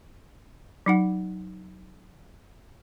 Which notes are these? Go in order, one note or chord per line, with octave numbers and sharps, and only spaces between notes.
F#3 D#4 F#5